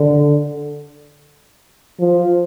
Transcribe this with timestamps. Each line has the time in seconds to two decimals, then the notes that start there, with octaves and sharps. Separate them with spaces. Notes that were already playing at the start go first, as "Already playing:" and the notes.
Already playing: D3
2.00 F3